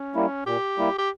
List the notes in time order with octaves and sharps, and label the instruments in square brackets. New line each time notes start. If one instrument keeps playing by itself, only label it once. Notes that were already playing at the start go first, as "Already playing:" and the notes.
Already playing: [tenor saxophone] C#4
[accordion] G3 A#3 E4
[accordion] A#2 [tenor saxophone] G4
[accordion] G3 A#3 E4
[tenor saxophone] G4